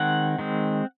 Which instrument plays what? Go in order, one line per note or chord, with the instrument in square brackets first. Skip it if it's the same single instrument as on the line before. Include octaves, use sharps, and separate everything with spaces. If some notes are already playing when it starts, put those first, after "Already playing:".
Already playing: [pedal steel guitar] D#3 G#3 C4 F#5
D#3 G#3 C4